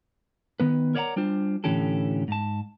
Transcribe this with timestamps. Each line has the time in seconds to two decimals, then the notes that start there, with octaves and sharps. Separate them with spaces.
0.60 D#3 B3 B4
0.95 A#4 C#5 D5 E5 F#5 A#5
1.16 G3 D4 F4 C5
1.64 A2 D3 E3 C#4 G4 A4
2.28 G#2 A5